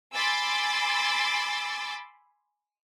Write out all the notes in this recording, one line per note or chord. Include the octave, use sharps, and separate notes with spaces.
G#5 B5 C6 D6 E6 A6